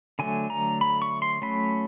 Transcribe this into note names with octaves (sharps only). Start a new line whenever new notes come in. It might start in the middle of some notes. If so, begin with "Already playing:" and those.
D3 F#3 A3 G#5
A#5
B5
C#6
C6
F#3 A3 C#4 B5